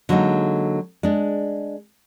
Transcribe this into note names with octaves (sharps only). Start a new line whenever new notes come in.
D3 F#3 G#3 A#3 D#4
G#3 D4